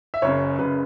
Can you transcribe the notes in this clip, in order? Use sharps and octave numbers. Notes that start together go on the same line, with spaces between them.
E5
F#1 F#2 C#3 C#5
F#1 F#2 C#3 B4